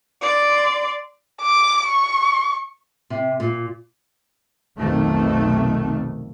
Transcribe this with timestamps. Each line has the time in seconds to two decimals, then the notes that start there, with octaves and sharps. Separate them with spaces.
0.22 D5 C6
1.41 D6
1.88 C#6
3.10 C3
3.40 A#2
4.78 B1 F2 C3 D#3 A3